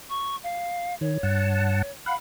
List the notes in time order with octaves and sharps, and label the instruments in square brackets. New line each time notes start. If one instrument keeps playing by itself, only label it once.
[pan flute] C#6
F5
[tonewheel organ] D#3 [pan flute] C#5
[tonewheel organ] G2 F#5 A5
[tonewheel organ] F5 F#5 [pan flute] B5